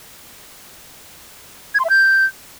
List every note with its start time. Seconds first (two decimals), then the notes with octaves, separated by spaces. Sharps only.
1.75 G#6
1.80 C6
1.85 E5
1.90 G6